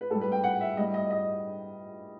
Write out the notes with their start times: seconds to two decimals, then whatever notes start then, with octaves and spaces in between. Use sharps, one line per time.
0.01 B4
0.10 A2 A4
0.14 G3
0.21 B4
0.32 G5
0.44 F#5
0.61 E5
0.77 A2 G3 D#5
0.94 D#5
1.11 D#5